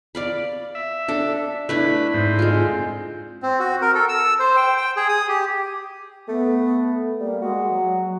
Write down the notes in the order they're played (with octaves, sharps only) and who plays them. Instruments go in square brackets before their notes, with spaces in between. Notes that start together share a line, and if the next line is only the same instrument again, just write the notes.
[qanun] D5 F5 B5
[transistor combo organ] E5
[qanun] D4 A4
[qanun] A3 D4 E4 [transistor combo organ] B4 B5
[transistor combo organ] G#2 C4
[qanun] G#3 F4
[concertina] C4
F#4
A#4
A4
E6
C5
G5
G5
G#4
D#6
G4
[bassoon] A3 [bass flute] B3
[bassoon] G3 [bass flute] A#3
[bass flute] G#3 [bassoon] F#4
[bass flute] F#3